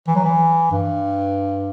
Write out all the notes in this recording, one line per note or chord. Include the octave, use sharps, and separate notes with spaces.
E3
F#3
E3
G2